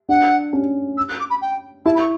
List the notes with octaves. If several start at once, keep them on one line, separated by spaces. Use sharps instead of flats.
D4 F#5
C#4
E6
F#6
D6
B5
G5
E4 A5
B5
C#6